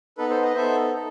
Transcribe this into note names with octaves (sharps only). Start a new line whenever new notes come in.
B3 D#4 A4 B4
A4 C5
B4 D#5
B3 D#4 A4 C5 E5
D#4 A4